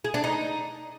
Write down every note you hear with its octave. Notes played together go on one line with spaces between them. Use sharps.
G#4
D4
D#4